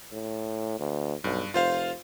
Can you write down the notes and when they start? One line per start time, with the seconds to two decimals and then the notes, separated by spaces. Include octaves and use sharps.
0.12 A2
0.79 D2
1.24 B1 G2
1.54 F1 F4 C5 F5